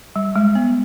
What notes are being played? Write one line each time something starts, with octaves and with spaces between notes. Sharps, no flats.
G3
G#3
B3